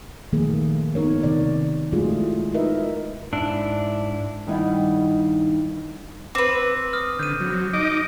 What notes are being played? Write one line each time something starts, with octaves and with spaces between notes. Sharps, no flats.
D#3 F3 A3 A#3 G#4
A3 B3 D#4 A#4 C#5
C3 D#3 D5
G#3 A3 F4 F#4 G#4
E4
D#4 F4 A#4 B4 D#5 E5
G#2 D4 E4
G2 D#3 G3 D#4 E4 F#5
C4 B4 D6
D#6 F6
D3 G6 D#7
F#3
D#4 D#5 D6